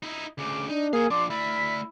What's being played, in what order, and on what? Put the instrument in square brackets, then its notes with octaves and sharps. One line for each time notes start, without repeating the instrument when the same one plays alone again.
[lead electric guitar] D#4 E4
[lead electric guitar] D2 C#3 [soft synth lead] D6
[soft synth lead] D4 [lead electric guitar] D#4
[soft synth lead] A#3 [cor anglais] G#4 [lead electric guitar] F5 G#5
[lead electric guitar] F3 D4 [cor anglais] D5 [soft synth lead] C6
[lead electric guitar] A3 D5 [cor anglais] E4 [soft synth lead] B6